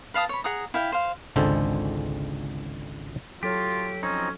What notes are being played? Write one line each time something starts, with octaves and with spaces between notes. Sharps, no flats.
B4 F5 A5 D#6
C#5 B5
G#4 F#5 A#5 D#6
E4 F5 G5
C5 F5
G#1 C#2 D3 G#3 A4 C5
F#3 F4 G4 A4 C#5
F3 C4 C#4 D#4